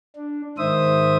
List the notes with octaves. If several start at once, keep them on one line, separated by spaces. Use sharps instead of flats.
D4
G#2 D#3 C5 E5 D#6